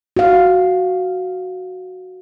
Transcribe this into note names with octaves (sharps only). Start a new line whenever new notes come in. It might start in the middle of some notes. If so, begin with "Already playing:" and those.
F#4 F5